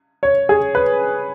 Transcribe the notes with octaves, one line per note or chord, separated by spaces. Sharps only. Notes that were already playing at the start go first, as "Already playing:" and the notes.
C#5
G#4
B4